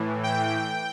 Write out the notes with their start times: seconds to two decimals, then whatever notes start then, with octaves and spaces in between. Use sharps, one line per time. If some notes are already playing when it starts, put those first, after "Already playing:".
Already playing: A2 E3
0.23 G5